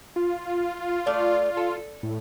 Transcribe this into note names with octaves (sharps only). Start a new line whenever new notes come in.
F4
A3 D5 F5
A4
A2